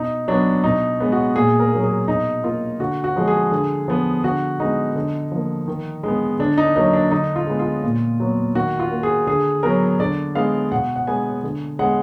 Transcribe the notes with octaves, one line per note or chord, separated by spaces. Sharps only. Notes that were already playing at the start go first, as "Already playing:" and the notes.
Already playing: B2 D#4
F#3 B3 D4
B2 D#4
G#3 B3
F#4
A#2 G#4
A#4
F#3 A#3
G#4
B2 D#4
A#3 F4
D3 F#4
F#4
F3 G#3
G#4
D3
F3 B3
D3 F#4
G#3 B3 D#4
D3
F3 A#3
D#3
G#3 B3
D3 D4
D#4
F#3 A#3 D#4
D4
D3 D#4
F4
G#3 B3
F4
A#2
F#3 B3
D#3 F#4
F4
A#3
G#4
D3 G#4
F#3 B3 A#4
D3 D5
G#3 B3 F5
B2 F#5
F#5
G#3 B3 G#5
D3
G#3 B3 F#5